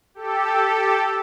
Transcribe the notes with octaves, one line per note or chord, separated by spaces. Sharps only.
G4 A4